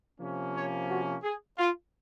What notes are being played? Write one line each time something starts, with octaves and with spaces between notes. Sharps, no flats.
C3 F3 A#3 C#4
C#5
F#4
G#4
F4